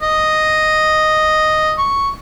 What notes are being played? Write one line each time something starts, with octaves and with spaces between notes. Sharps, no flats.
D#5
C#6